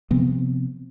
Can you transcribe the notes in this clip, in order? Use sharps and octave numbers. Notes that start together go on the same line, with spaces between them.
C3 F3 B3 C4